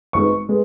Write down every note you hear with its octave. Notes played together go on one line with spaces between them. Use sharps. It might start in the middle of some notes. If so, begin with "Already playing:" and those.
G#1 G#2 G#3 B3 C#6
G#3 B3